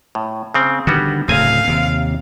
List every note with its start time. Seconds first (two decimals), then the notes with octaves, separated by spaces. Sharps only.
0.15 A2
0.54 C#3 C4
0.87 D3 D#3 G3 B3 F#4
1.28 D1 A2 C#3 C4 F5 G#5 A#5
1.67 D#2 C3